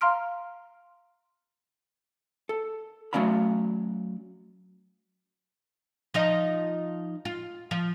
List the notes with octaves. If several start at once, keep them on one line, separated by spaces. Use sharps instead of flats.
F5 A#5 C6 F6 D7
A4
F#3 A3 C#4 D5 F5 B5
F3 D#4 D#5
F4
F3